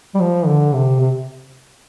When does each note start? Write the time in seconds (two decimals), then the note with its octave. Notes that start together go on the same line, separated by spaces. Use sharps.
0.15 G3
0.20 F3
0.47 D3
0.74 C3
1.00 C3